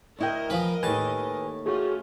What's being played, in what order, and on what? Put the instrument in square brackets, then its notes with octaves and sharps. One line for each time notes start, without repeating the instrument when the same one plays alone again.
[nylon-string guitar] D2 E4 G5 [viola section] A#4 D#5
[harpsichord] F3 B4 [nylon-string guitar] G#5
[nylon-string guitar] D#2 A2 G4 [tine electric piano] B4 G#5 [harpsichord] A5
[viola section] A3 C#4 F4 [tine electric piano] F#4 G#4